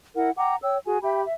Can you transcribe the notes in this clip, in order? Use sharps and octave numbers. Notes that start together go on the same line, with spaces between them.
E4 A#4 F#5
F#5 G5 A#5 D6
C#5 G5 E6
F#4 G#4 G#5
G4 E5 G5 B5
E5